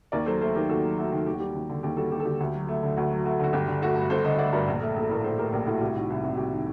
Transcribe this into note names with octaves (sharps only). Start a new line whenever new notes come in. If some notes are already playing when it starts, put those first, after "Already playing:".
D#2 A#4 D5
F#3 A4 C5
A3 A4 C5
D#3 G4 A#4
D#2 F#4 A4
F#3
A3 F#4
D#3
D#2 G4
F#4
G3 G4
D#2
D3
D#2 G4
G3 F#4 A4
D#2 G4
A4
D3 G4
D2
F#3
A3
D3
D2 F#4
F#3
A3 F#4
D3 F#4
G1 G4
D3
A3 F#4 A4
G2
G1 A4 C5
D3 C5 D#5
A3 D5 F#5
G2 A#4 D5
A#1
A3
A#1 A4
A2 A#4
A#1 A4 C5
A3 G4 A#4
A#1 G4 A#4
A2 F#4 A4
C2 G4
D#3 F#4
C2
C3 F#4
C2 G4
D#3